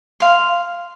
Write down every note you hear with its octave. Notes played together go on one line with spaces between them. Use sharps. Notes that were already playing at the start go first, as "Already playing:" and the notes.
F5 C6